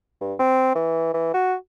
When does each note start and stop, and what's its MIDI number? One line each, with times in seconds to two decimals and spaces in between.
0.21 0.34 43
0.39 0.75 60
0.75 1.13 52
1.14 1.33 52
1.34 1.55 66